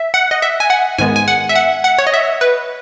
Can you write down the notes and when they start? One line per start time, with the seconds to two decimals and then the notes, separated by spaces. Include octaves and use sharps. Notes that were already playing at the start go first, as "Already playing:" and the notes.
Already playing: E5
0.14 F#5
0.31 D#5
0.42 E5
0.60 G#5
0.70 F#5
0.98 G#2 D#3 G#3 B3 G#5
1.16 G#5
1.28 F#5
1.49 E5
1.56 F#5
1.84 F#5
1.99 C#5
2.07 D#5
2.14 E5
2.41 B4